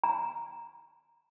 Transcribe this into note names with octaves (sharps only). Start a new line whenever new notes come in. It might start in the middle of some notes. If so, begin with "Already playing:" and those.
A#5